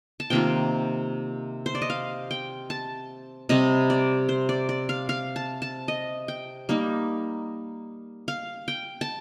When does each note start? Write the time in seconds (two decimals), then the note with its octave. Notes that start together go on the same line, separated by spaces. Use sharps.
0.20 A5
0.30 C3 D#3 A#3 F4 G5
1.66 C5
1.75 D5
1.82 D#5
1.90 F5
2.31 G5
2.70 A5
3.49 C3 G3 C4 D#5
3.90 D5
4.29 C5
4.49 D5
4.69 D5
4.89 F5
5.09 F5
5.36 A5
5.62 A5
5.88 D#5
6.28 G5
6.69 G3 A#3 D#4
8.28 F5
8.68 G5
9.01 A5